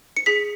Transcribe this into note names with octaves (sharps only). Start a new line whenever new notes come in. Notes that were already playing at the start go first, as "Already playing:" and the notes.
C#7
G#4 B6